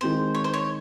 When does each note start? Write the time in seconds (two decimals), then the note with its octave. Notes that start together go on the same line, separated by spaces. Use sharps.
0.01 D#3 G#3 C4 C5
0.35 C#5
0.44 C5
0.54 C#5